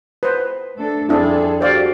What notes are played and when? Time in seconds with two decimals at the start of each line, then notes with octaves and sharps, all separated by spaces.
0.23 B4 C5
0.77 A3 D4 A4
1.09 F2 C4 D4 E4 G#4 A4
1.61 F#4 G4 C5 D5 F5